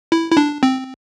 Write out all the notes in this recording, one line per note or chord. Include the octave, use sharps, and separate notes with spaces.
E4
E4
D4
C4